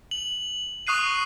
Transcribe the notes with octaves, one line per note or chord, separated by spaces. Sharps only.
F#7
C#6 D#6 F#6 C7 D#7